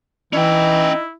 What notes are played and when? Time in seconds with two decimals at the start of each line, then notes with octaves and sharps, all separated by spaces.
0.33 E3 C#4 D#4 E4 G5